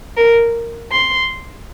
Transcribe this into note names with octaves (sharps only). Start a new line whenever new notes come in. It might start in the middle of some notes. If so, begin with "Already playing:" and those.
A#4
C6